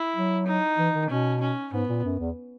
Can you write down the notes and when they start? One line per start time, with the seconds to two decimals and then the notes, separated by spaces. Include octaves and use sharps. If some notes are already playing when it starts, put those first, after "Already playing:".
Already playing: E4
0.16 F#3
0.47 D#4
0.78 E3
0.95 D#3
1.09 B2 C#4
1.41 C#4
1.73 G#2 B3
1.89 A#2
2.04 F#2
2.20 E2